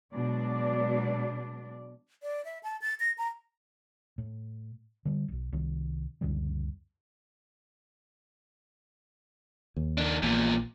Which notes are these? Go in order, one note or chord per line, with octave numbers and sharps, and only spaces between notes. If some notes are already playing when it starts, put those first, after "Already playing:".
B2 F#3 G#3 D4 D5
D5
E5
A5
A6
A#6
A#5
A2
D3 G3
E1 B1
C2 D#3
C#2 F#2 D3 G3
D#2
D#3 D4
A#1 E2 A#2 A#3